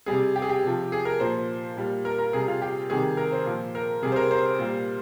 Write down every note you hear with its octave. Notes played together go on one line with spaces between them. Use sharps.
C3 G3 G#4
G4
G#4
G4
C3 F3
G#4
A#4
A#2 F3 C5
A#2 G3
A#4
A#4
C3 G3 G#4
F4
G4
C3 D#3 G3 G#4
A#4
C5
A#2 F3
A#4
C3 G3 G#4
C5
A#4
C5
A#2 G3